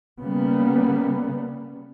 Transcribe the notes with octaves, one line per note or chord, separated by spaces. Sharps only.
C#3 G3 A#3 B3